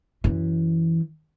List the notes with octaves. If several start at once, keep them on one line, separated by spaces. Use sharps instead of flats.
F#2 E3